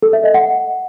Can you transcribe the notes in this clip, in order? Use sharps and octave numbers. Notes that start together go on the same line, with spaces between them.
A4
E5
D#5
F#5